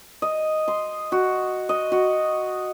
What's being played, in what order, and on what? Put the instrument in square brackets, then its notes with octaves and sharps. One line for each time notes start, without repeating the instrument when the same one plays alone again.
[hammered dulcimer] D#5
C6
F#4
D#5
F#4